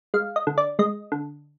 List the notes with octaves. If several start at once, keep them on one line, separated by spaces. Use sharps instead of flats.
G#3 F5
D#5
D3
D5
G#3 D#5
D3